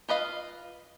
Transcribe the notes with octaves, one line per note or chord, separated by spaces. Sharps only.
F4 B4 D#5 F5